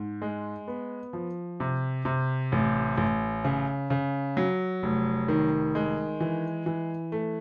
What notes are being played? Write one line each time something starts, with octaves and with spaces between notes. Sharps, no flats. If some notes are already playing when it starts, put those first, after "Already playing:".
Already playing: G#2
G#3
B3
F3
C3
C3
A1
A1
C#3
C#3
F#3
F1
D#3
G#3
E3
E3
A3